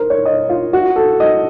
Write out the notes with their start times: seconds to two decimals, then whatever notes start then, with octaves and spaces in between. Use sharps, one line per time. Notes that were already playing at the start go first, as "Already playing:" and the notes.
Already playing: A#4 C5
0.10 C#5
0.26 D#5
0.49 F4
0.73 F#4
0.96 A4
1.20 D#5